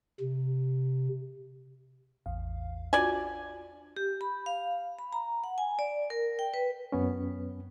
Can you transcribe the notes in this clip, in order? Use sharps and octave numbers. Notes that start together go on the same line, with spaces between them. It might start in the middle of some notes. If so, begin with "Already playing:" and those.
C3
A1 E2 F5
D4 F4 F#4 D5 G#5
G4
B5
F5
B5
A#5
F#5
G#5
D5
A#4
G5
B4
F#2 B3 C#4